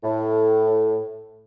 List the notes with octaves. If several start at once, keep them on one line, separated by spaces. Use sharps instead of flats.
A2